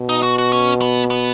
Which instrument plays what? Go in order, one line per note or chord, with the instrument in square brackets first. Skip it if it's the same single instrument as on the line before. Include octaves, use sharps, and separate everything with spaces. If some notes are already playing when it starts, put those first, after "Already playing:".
Already playing: [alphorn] B2
[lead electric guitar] D#4
F#4
F#4
C#4
B3
B3